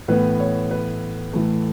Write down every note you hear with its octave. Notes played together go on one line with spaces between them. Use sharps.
A2 E3 B3 B4
C#5
B4
A2 E3 A3